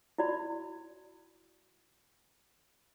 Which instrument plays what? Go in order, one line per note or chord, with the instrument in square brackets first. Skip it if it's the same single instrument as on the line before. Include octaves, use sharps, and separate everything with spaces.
[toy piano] E4 F#4 D5 B5